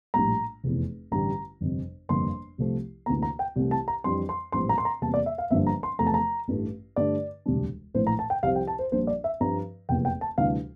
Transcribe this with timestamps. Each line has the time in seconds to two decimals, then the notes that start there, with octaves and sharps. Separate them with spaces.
0.14 A#1 A2 G3 A#5
0.64 F1 E2 C3 E3
1.11 A1 G2 D3 G3 A#5
1.61 G1 F2 C3
2.09 G1 F2 C3 F3 A#3 C6
2.58 C2 C3 F3 A3 C4
3.06 D2 C3 E3 A#3 A#5
3.23 A#5
3.39 G5
3.56 C2 C3 E3 A3
3.71 A5
3.88 A#5
4.04 F2 E3 G3 D4 C6
4.29 C6
4.52 A#1 A2 E3 G3 C4 C6
4.69 A#5
4.78 C6
4.85 A#5
5.01 E2 C3 G3 A#3 A5
5.14 D5
5.26 E5
5.38 F5
5.51 G1 G2 D3 F3 A#3 E5
5.67 A#5
5.83 C6
5.99 E2 C3 F3 A3 A#5
6.07 A5
6.14 A#5
6.48 A1 G2 E3 A3
6.96 G2 D3 A3 D4 D5
7.46 E1 D2 C3 G3 D4
7.94 A#1 A2 E3 A3 C5
8.07 A#5
8.19 A5
8.30 G5
8.43 C2 C3 F3 C4 F5
8.55 G5
8.67 A5
8.79 C5
8.92 A#1 A#2 G3 D4 C5
9.07 D5
9.24 E5
9.41 G2 F3 C4 A#5
9.89 F1 E2 C3 E3 A#3 G5
10.05 G5
10.21 A5
10.38 D2 C3 E3 G3 D4 F5